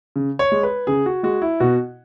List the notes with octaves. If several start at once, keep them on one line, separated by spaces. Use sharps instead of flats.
C#3
C#5
G#3
B4
C#3 G#4
F#4
G#3 F#4
E4
B2 F#4